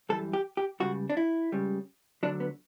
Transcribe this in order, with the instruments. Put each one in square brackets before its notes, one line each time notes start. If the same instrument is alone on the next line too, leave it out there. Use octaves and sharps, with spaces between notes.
[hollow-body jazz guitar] F#2 E3 G3 A4
G4
G4
C#2 C#3 G3 F#4
D4
E4
C#2 C#3 G3
D2 D3 F#3 D4
B3